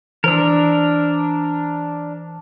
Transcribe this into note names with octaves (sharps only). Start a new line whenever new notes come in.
E3 D4 A#4 C5 E6